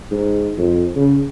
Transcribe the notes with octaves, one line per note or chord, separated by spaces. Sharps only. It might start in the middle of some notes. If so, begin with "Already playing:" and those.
G#2
F2
C#3